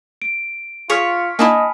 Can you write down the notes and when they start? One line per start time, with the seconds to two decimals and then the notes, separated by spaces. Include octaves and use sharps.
0.22 D7
0.90 F4 G#4 C#5 F6 B6 C#7
1.39 A#3 D4 E4 D#5 G#5 A5 B5